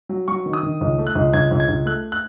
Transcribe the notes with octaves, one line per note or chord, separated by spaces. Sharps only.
F#3
F#3 C#6
D#3
D#6
D#3
C#2
A3
F#6
C#2
C#2 G#6
C#2
G#6
C#2
A3 F#6
F#6